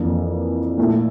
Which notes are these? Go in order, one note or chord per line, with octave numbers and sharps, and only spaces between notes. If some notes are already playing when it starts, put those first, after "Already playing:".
Already playing: F2 E3 A#3 D4
A#2 A3 E4